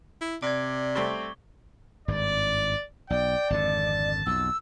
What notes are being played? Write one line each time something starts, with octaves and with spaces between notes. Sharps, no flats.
E4
C3 D5 D6 G#6
G3 A3 C4 C#6 G7
G#1 G2 D5
B1 D5 G5
G#1 F2 D3 A5
B1 F2 E6